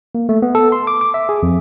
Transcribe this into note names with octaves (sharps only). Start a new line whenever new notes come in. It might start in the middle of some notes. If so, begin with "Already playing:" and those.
A#3
A3
B3
A4
C6
D6
D6
E5
G#4
F2